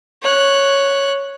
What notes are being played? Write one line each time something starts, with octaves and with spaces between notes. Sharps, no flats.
C#5 F#6